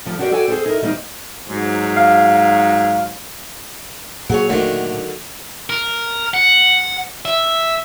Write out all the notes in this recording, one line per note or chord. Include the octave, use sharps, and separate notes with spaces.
D2 F3 G3
D4 F#4 G4 A#4 C5 D5
F#4 A4 D5 G5 G#5
G#4 A4 C5
D#4 E4 A#4
D#3 G3 A#3 C#4 D#4 C5
G#2 F#3
F5
A#2 F#3 A#3 G#4 C#5
D3 D#3 F#3 A3 D4
A#4
F#5
E5